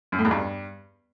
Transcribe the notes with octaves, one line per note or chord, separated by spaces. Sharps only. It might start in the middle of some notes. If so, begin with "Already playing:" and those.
F#2
A2
E2
G2